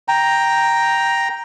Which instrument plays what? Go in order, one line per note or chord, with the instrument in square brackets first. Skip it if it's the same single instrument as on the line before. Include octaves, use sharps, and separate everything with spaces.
[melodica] G5 A#5